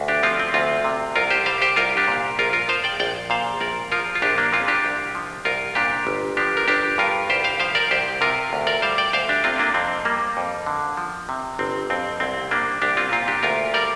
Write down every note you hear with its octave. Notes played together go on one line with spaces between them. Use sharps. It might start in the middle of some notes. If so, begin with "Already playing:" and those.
Already playing: D2
D4 G4
F3 C4 F4
C4
D2 C4 F4
C3
C2 F4 A#4
G4 C5
G3 C5 F5
G4 C5
C2 F4 A#4
D4 G4
A#2
A#1 F4 A#4
F4 A#4
F3 C5 F5
D5 G5
A#1 D5 G5
A#2 C5 F5
A#1 A#4 D5
F3 F4 A#4
F4
A#1 D4 G4
A#3 D4
A#2 C4 F4
D4 G4
C2
F3
C2 F4 A#4
A#2 D4 G4
G1
F3 D4 G4
A#4
G1 D4 G4
G2 F4 A#4
C2 G4 C5
C5 F5
F3 C5 F5
A#4 D5
C2 G4 C5
C3 F4 A#4
D2
A#4 D5
G3 C5 F5
D5 G5
D2 C5 F5
D4 G4
C3 C4 F4
A#3 D4
F2 C4
G3 A#3
F2
D3
F3
C3
G1 C4
F2 C4
C2 C4
G3 A#3 D4
C2 D4 G4
C4 F4
A#2 C4 F4
D4 G4
D2 F4 A#4
G3 A#4 D5